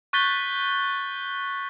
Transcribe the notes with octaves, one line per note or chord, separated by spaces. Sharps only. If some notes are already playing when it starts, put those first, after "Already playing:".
C#6 F#6 G6 A6 B6 G7